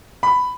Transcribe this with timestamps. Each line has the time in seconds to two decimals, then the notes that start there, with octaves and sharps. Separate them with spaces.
0.23 B5